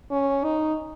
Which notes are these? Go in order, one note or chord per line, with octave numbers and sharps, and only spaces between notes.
C#4
D#4